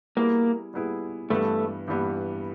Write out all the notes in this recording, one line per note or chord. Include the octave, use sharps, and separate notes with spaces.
G3 A#3 B3 E4 G#4
G3 B3 E4 G#4
G2 E3 G3 A3 B3
G2 E3 G3 B3